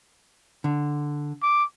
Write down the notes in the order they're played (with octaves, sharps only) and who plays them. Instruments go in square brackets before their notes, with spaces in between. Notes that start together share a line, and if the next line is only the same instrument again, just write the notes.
[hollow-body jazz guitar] D3
[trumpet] D6